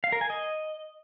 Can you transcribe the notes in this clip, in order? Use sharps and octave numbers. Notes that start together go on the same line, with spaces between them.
F5
A#4
G#5
D#5